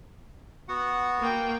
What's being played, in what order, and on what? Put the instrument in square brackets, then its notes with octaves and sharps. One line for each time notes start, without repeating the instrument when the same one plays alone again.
[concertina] B3 F#4 F#5
[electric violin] A#3 G5